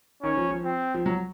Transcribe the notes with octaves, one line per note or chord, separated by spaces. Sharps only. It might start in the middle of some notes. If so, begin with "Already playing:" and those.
D#3 C#4
F3
F3
C4
F3
F#3